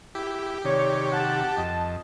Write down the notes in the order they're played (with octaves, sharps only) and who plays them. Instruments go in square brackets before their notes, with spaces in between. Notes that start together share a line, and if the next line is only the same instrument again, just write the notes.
[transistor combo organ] E4 [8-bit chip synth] G4
[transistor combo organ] C3 D#3 [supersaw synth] C#5 [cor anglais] D5
[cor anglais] F#5 [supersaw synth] A5
[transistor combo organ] F2 [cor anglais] D#5